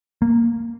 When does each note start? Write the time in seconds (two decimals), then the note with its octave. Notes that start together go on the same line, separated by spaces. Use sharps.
0.22 A#3